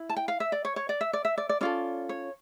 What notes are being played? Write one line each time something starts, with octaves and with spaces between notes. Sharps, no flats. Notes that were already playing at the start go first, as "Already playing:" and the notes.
Already playing: E4
A5
G5
F5
E5
D5
C#5
C#5
D5
E5
D5
E5
D5
D5
C#4 F4 A4 D5
C#5